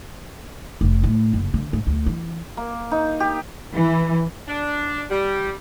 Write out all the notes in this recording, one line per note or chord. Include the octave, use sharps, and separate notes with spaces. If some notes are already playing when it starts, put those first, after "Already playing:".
F1
A2
F#1
D3
G#2
D2
E3
A#3
D#4
G4
E3
D4
G3